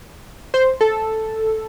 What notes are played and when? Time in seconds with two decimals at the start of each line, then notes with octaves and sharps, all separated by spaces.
0.54 C5
0.81 A4